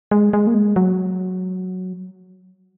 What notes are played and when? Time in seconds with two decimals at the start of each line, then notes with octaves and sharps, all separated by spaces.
0.11 G#3
0.33 G#3
0.47 A#3
0.54 G#3
0.76 F#3